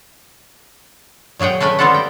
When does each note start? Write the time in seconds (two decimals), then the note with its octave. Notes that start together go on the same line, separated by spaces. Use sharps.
1.39 A#2 F#3 G#4 F#5 G5
1.60 A3 C#4 B4 G5 G#5
1.79 G3 B3 C4 F4 A4 F#5
1.94 G5